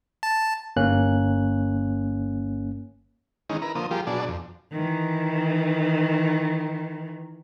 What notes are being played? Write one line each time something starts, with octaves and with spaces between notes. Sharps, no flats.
A5
G1 A#3 C#4 F#6
D#3 E3 G#3 C#4 D#4
E4 A#4 B4 A#5
D3 F3 A#3 C5 D#6
F3 G3 F4 G4 G#4 A#4
B2 F#3 D4 G#4 D5 A5
F2
D#3 E3